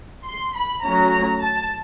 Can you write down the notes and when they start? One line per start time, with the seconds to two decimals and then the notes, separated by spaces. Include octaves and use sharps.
0.25 C6
0.54 B5
0.82 F#3 A3 C#4 A#5
1.39 A5